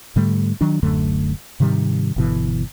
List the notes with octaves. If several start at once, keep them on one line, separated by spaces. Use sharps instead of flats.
G#2 D3 G3 A3
D#3 F#3 D4
D1 F#2 D3 A3
G#2 C3 D#3 G3
G1 B2 E3